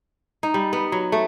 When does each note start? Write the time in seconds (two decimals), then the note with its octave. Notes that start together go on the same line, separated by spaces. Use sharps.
0.43 D#4
0.54 G3
0.73 B3
0.92 F#3
1.12 A3